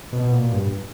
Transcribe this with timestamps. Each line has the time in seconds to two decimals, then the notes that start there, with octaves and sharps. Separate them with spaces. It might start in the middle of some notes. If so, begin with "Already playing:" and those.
0.12 B2
0.32 A#2
0.52 G2